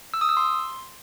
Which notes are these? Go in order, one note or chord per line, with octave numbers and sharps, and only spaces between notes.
E6
D#6
E6
C6